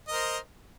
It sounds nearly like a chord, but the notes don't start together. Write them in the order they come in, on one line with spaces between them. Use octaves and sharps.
D#5 A#4 C5